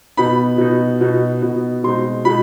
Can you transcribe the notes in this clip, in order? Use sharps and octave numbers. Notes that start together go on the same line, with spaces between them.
B2 B3 D#4 B5
B2 B3 D#4
B2 B3 D#4
B2 B3 D#4
B2 G#3 C4 D#4 C6
B2 G#3 D#4 B5